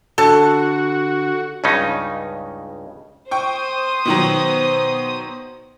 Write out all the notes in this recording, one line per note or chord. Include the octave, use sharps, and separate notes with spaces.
D3 F#4 A4 A5
C#2 G2 C#3 C#4 D#4
C5 G5 C#6 D#6
B2 D#3 F#3